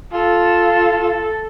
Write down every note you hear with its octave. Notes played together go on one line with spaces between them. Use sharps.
F4 A4